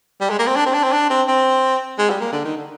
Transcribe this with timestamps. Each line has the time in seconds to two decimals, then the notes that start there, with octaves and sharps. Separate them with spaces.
0.21 G3
0.30 G#3
0.39 A#3
0.47 C4
0.56 D4
0.66 C4
0.74 D4
0.83 C4
0.93 D4
1.10 C4
1.28 C4
1.98 G#3
2.10 G3
2.21 A#3
2.32 D3
2.45 D#3
2.57 D3